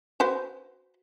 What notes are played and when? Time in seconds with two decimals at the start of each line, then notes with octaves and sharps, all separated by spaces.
0.20 F#4 B4 C5